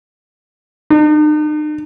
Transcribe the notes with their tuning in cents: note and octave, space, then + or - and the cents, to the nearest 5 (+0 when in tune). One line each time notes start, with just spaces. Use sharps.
D#4 -45